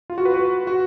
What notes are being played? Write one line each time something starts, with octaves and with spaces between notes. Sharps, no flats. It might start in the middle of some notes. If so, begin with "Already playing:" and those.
F4
F#4
B4
F#4
F#4